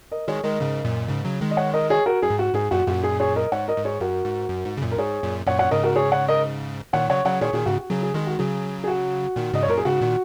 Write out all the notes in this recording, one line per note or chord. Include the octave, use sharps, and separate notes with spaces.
A#4 D#5
D#3 G#3 G#4 C#5
D#3 G#3 A#4 D#5
G#2 C#3
F#2 A#2
G#2 C#3
C#3 F#3
D#3 G#3
D#5
C#5 F#5
A#4 D#5
G#4 C#5
F#4 A#4
F#2 G#4
G#2
F#4
G#2 G#4
F#2 A#2 F#4
F#2 A#2 F#4
G#4
G#4 C#5
A#4 D#5
G#2 C#5 F#5
A#4 D#5
G#2
G#4 C#5
F#2 F#4 A#4
G#2
F#2
G#2
C#3
F#2 A#2
A#4
G#2 G#4 C#5
F#2 A#2
F#2 A#2 C#5 F#5
C#5 F#5
G#2 C#3 A#4 D#5
F#4 A#4
G#4 C#5
C#5 F#5
A#4 D#5
A#2 D#3 C#5 F#5
C#3 F#3 C#5 F#5
C#3 F#3 C#5 F#5
A#2 D#3 G#4 C#5
A#2 D#3 G#4
G#2 C#3 F#4
F#4
C#3 F#3 G#4
G#4
D#3 G#3 G#4
F#4
C#3 F#3 G#4
G#4
F#4
A#2 D#3
G#2 C#3 D#5
C#5
F#2 A#2 A#4
G#4
G#2 C#3 F#4
A#2 D#3